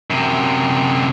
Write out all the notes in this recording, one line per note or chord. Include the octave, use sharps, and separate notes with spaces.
F#2 C3